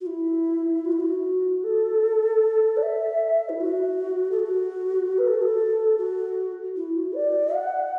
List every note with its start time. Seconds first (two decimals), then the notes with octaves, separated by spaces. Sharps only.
0.01 F#4
0.06 E4
0.85 F#4
0.92 E4
1.00 F#4
1.64 A4
2.77 D5
2.83 E5
3.49 E4
3.61 F#4
4.31 A4
4.40 F#4
5.18 B4
5.27 A4
5.34 F#4
5.42 A4
5.98 F#4
6.76 E4
6.96 F#4
7.15 D5
7.55 F#5